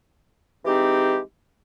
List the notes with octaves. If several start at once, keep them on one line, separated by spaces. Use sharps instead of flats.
E3 G#3 C4 D#4 G4